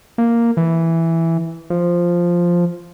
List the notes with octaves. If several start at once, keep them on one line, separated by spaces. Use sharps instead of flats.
A#3
E3
F3